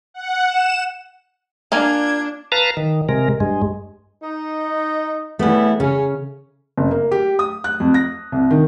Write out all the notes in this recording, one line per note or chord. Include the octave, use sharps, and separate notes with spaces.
F#5
E7
A#3 D4 F4 G#5 G#6
B4 F5 A5 A#5
D#3
C3 G#3 A#4
G2 G#3
D#4
C#3 G3 A3 B3 E4
C#3 C#4
F#1
A#3
G4
D#6
F#6
F2
A#6
C2
D#3